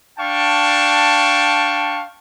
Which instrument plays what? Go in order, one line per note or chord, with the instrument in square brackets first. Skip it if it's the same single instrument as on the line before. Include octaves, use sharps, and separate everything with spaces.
[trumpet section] D4 F5 G5 A5 C#6